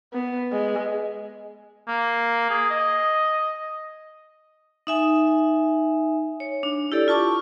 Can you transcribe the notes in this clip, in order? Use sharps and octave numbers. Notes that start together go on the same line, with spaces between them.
B3
G#3
A#3
G#4
D#5
D#4 E5 G#5
C#5
D4
E4 G4 A4 D5
F4 A5 C#6 D6